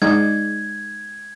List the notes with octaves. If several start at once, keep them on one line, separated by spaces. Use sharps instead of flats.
G#3 D#4 D5 G#6